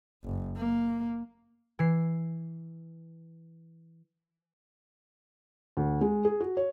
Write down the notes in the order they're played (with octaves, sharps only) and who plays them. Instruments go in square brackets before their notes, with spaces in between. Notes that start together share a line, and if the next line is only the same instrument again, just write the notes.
[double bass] F#1
A#3
[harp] E3 C7
[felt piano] D2
G#3
G#4
F#4
C#5